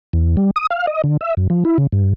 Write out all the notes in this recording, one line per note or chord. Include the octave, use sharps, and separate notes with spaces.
E2
G3
D#6
F5
D#5
D3
E5
F#2
F3
E4
C#3
G2